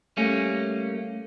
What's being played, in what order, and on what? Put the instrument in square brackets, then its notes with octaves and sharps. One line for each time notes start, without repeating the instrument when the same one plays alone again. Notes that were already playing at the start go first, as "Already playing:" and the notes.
[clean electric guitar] G3 A3 A#3 C#4